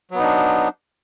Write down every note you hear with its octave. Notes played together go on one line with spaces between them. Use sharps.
F#3 B3 D4 D#4